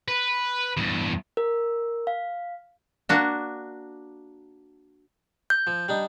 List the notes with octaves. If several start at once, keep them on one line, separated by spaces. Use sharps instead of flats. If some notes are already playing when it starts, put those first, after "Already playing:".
B4
E2 G2
A#4
F5
A#3 D4 F#4
G6
F3
G3 D4 D#4